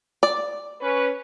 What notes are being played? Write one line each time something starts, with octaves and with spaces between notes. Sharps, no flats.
D5
C#4 B4